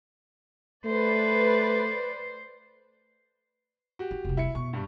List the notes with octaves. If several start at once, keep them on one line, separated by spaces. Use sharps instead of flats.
A3 B4 C5 D5
F#4 G4
E4
F1 C2
E4 C#7
B2 C#6
G2 G3